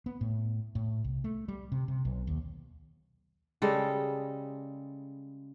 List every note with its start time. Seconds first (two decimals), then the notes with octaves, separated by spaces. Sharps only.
0.06 B3
0.21 A2
0.75 A2
1.04 C2
1.24 A3
1.48 G3
1.72 C3
1.88 C3
2.05 B1
2.27 D#2
3.62 C#3 G3 G#3 A4